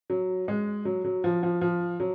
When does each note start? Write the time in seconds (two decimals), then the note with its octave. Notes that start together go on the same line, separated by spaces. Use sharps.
0.10 F#3
0.48 G#3
0.85 F#3
1.04 F#3
1.24 F3
1.43 F3
1.61 F3
2.00 F#3